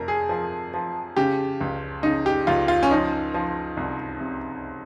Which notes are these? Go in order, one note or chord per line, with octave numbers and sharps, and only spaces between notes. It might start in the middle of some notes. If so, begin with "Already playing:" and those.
Already playing: F2 C3 A#4
G#4
F3
F3
C#3 G4
C#2
C#3 D#4
G4
C#2 F4
F4
C#4
F3 D#4
F3
C2
C3